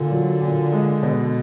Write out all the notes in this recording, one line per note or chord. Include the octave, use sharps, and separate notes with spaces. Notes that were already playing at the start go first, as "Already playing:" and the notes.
Already playing: A#2 D3
F#3
A#2
G#3
B2